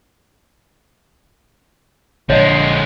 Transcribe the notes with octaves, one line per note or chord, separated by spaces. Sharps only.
A#1 D3 G#3 C#5 D#5